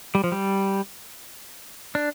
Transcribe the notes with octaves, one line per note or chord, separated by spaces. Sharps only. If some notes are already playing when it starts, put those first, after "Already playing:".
G3
F3
G3
D4